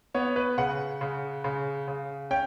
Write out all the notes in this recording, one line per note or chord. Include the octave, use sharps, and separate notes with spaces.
B3 C#5
B4
C#3 F#5
C#3
C#3
C#3
C#4 G5